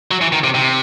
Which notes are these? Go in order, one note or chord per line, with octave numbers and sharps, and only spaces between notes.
F#3
E3
D#3
C3
C3